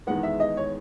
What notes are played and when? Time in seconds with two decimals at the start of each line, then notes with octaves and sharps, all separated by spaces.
0.07 E2 D#3 G#3 B3 F#5
0.23 E5
0.40 D#5
0.57 C#5